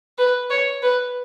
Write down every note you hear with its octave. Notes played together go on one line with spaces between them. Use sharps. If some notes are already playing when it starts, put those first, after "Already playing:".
B4
C#5
B4